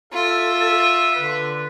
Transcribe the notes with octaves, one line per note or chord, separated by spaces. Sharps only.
F4 A4 E5
D3 B4